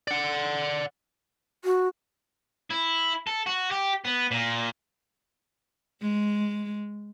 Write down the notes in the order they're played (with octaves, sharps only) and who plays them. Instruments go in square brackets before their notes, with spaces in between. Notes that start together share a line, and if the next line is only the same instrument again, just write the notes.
[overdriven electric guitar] D5 F#5
[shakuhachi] F#4
[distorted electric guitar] E4
A4
F#4
G4
B3
A#2
[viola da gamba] G#3